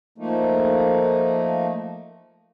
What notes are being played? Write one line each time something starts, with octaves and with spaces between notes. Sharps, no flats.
F3 A3 A#3 D#4